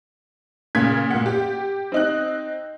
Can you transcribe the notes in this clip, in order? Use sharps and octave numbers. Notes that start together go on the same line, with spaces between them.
A#2 C#3 G#6 B6
A#2 F#5
G4
C4 D#4 F#6